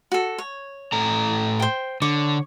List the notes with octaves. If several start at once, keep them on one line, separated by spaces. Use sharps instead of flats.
F#4 A4
C#5
A2 A4 A#5
C5 G5
D3 C#5 C#6 D6